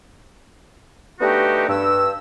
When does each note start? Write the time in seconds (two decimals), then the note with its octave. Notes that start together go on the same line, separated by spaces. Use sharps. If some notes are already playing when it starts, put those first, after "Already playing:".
1.20 A3 B3 D4 D#4 F#4 G4
1.68 G2 E6